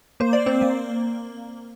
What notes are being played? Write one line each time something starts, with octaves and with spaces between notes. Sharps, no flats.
A#3 C5
D5
C4 C5
A#3